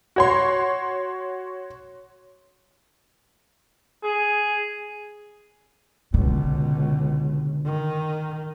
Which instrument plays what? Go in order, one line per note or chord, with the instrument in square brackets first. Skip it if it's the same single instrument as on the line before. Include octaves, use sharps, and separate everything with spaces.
[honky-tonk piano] F#4 C#5 C6
[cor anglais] G#4
[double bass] C#2 B2 [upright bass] D3
[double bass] D#3